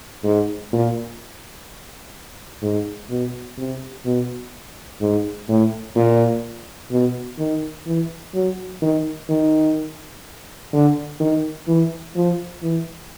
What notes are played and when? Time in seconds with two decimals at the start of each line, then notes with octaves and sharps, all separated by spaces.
0.24 G#2
0.73 A#2
2.62 G#2
3.10 B2
3.58 C3
4.05 B2
5.01 G#2
5.49 A2
5.95 A#2
6.91 B2
7.39 D#3
7.86 E3
8.34 F#3
8.82 D#3
9.29 D#3
10.73 D3
11.20 D#3
11.67 E3
12.15 F3
12.63 E3